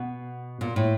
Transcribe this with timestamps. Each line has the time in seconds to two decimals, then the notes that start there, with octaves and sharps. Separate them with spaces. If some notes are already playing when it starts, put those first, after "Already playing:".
Already playing: B2
0.61 A#2
0.76 A2